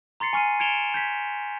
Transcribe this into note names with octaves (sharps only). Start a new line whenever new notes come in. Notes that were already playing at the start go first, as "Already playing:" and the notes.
A#5 C6 A6 C7 C#7
G#5 C#6 F6 C7 D#7
G#6 C#7 D7 E7 F7 G7
G6 G#6 B6